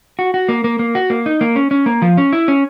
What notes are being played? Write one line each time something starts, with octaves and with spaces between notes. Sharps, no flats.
F#4
F#4
A#3
A#3
A#3
F#4
A#3
D#4
A#3
C#4
C#4
A#3
F3
C#4
E4
C#4